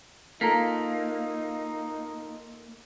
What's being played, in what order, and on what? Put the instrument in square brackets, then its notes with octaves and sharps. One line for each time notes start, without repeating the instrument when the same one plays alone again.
[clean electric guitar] A#3 [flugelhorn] D#4 [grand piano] F4 A4 [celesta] A#5 B6